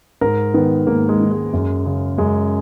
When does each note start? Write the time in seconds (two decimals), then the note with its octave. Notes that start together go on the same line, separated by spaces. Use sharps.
0.21 G#2 A#4
0.54 D#3 B3
0.87 G#2 A#3
1.09 G#3
1.20 D#3
1.31 G#3
1.53 F#2
1.86 C#3
2.18 F#2 G#3